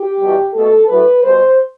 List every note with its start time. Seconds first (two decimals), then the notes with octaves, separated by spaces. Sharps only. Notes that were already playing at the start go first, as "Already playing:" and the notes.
Already playing: G4
0.18 E2 B2 G3
0.54 B2 A3 A4
0.88 A2 F#3 A3 B4
1.24 B2 G3 C5